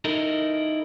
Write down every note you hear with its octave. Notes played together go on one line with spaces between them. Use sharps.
D#4 E4 A4 A#4